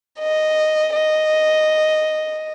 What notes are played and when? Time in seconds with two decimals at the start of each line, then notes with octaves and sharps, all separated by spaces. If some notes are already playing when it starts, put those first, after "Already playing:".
0.19 D#5
0.94 D#5